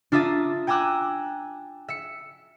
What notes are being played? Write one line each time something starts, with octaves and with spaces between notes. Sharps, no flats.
D4 F4 E5 A#5 D#6 A6
G5 G#5 A#5 D6 E6 F#6
E5 C#7